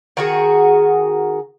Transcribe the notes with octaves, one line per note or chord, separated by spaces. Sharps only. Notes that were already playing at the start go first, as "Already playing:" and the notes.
D#3 F#4 G#4